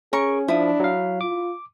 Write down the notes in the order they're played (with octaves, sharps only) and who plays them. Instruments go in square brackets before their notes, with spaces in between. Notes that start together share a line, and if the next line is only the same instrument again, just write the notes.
[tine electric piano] C#4 [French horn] G#4 [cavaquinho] A#4 C#6
[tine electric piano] F3 [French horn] D4 [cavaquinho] E4 D#6
[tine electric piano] F#3 F5
[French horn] F4 [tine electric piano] D6